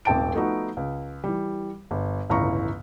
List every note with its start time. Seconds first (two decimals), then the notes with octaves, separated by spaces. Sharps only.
0.05 D#1 G#1 C4 G5 A5 D7
0.34 F3 A3 B3 D#4 F#4
0.77 C#2
1.24 E3 G3
1.91 G1
2.30 G1 C#2 A2 E3 A#5 C#6